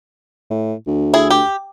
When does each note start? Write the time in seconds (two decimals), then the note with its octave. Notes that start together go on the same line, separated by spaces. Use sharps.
0.50 A2
0.87 D2
1.14 E4 G#4
1.30 G4